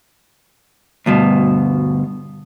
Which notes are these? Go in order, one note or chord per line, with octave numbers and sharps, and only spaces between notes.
D2 G2 B2